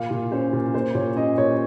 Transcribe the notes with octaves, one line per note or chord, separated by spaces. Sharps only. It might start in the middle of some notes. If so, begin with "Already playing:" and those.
Already playing: A#2 F5
A#2
C#4 C5
A#2
A#3 C5
A#2 C#5
C#4 D#5
A#2 C#5